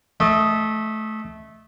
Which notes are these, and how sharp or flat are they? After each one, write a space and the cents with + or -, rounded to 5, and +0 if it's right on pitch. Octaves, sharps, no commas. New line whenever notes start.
A3 -15 D#5 +0